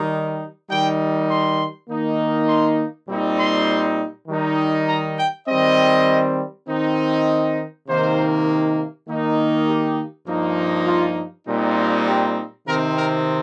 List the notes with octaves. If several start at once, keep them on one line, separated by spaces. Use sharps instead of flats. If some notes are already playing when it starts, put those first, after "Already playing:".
Already playing: D#3 G3 D#4
D#3 G3 D#4 G5
C6
D#3 A#3 D#4
C6
A#2 G3 C4 D#4
C6
D#3 G3 D#4
A#5
G5
D#3 G3 C4 D#5
D#3 C4 D#4
C3 D#3 A#3 D#4 C5
D#3 A#3 D#4
G4
G2 F3 A#3 D#4
F4
A#2 G3 C4 D#4
F4
G4
C3 D#3 C4 D#4 A#4
A#4